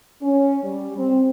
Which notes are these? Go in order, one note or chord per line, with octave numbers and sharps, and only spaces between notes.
C#4
G3
C4